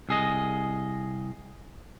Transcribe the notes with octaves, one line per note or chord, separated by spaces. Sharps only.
C2 G#4 D#5